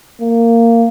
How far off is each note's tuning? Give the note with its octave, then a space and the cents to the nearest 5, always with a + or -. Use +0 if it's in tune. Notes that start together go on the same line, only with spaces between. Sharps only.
A#3 -15